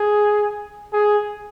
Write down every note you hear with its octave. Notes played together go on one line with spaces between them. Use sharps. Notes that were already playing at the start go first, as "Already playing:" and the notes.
Already playing: G#4
G#4